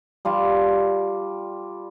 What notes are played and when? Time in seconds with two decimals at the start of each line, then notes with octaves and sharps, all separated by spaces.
0.25 G3 F4 A5